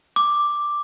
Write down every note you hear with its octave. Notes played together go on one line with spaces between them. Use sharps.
D6